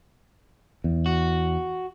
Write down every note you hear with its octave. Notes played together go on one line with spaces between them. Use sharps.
E2
F#4